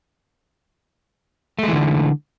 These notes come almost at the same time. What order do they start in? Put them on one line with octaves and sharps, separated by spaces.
A3 G#3 E3 D3